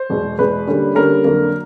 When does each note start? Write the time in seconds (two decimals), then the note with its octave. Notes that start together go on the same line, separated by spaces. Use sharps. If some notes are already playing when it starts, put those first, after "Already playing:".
Already playing: C5
0.09 E2 B2 G#3
0.38 E2 B2 G#3 B4
0.67 D3 G3 A#3 C#4
0.95 D3 G3 A#3 C#4 A#4
1.24 F2 D3 F#3 A#3